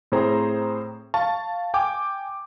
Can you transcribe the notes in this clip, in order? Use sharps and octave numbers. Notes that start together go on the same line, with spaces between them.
A2 C4 G#4 C5 A#5
F5 A5 C#6
G5 G#5 D6